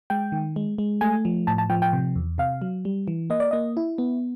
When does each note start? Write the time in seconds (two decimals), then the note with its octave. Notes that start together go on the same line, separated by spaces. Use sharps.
0.10 G#3 G5
0.32 D#3
0.56 G#3
0.78 G#3
1.01 A3 G#5
1.25 F3
1.47 A2 A5
1.58 A5
1.70 F3 G5
1.82 G5
1.93 C3
2.16 E2
2.38 C3 F5
2.62 F#3
2.85 G3
3.08 E3
3.30 A#3 D#5
3.40 D5
3.51 A#3 D#5
3.77 E4
3.98 B3